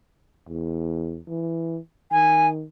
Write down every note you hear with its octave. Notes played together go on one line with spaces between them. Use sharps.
E2
E3
D#3 G#5